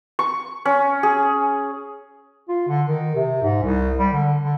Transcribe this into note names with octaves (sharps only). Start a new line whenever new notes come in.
C#6
C#4
G#4
F4
D3
D#3
C3
G#2
C2
G3
D3
D3